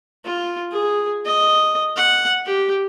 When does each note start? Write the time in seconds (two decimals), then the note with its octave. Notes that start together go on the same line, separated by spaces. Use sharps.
0.25 F4
0.72 G#4
1.26 D#5
1.96 F#5
2.46 G4